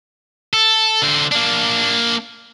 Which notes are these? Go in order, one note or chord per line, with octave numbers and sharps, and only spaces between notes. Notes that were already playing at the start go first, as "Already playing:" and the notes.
A4
D3 C5
A#3 D4